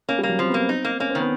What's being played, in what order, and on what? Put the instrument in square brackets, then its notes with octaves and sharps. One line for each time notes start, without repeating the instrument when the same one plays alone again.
[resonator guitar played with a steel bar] A#3 [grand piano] C#4
[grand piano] G3
[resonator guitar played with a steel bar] A#3
[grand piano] F#3
[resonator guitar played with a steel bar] F3 [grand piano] C4
[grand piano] B3
[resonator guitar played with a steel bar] A#3
[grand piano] C4
[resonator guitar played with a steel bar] D#4
A#3
[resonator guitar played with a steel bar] A#3 [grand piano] C#4
[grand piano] C4
[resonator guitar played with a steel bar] D#3
[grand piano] B3